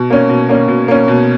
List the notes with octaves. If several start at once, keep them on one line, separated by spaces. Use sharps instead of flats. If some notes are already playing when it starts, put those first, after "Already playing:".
Already playing: B2
A#3 C#4
B2
A#3 C#4
B2
A#3 C#4
B2